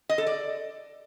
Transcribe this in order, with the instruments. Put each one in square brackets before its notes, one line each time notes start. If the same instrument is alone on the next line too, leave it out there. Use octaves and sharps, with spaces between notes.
[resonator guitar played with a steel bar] D#5
A4
D5